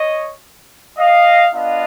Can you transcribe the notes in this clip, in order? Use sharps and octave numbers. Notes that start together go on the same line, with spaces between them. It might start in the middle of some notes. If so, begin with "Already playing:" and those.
Already playing: C#5 D#5
D#5 F5
B3 D4 F4 D#5 F5